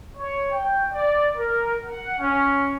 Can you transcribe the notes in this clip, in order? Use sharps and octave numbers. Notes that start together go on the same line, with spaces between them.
C#5
G5
D5
A#4
F#5
C#4